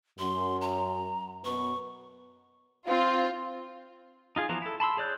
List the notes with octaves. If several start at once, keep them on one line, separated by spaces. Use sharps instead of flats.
F#2 C6
A#5
F#2 B2 B3 C#6
C4 F4
D#4 F4 G#4
E3 F3 B3 A#5
E4 A4
A5 B5 C6 E6
G#4 C#5 D5 F#6 G6